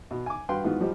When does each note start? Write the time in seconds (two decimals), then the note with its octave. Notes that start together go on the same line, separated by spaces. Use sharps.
0.11 B2
0.26 G#5 D6
0.49 G2 F#4 B4 F5 G5 C6
0.64 G#2 D#3 E3 B3 F4 F#4
0.80 F3 G3 D#4 F4 G4